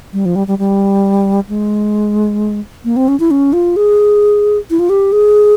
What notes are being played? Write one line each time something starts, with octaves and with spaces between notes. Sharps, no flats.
G3
F3
G3
G3
G3
G#3
A#3
C4
C#4
E4
C#4
F4
G#4
E4
F4
G4
G#4